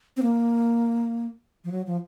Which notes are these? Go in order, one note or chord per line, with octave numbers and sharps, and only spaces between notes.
C4
A#3
F3
F#3
F3